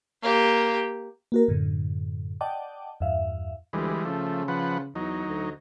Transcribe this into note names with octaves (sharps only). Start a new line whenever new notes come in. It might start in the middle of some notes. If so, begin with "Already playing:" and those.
A#3 G4
A#3 F#4 A#4
F#2 A2 D3
D5 D#5 F#5 G5 A5 D6
E2 G2 E5 F5
D2 E3 G3 G#3
C#3 F3 A3
F3 B4 F#5
E2 F#3 D#4
D2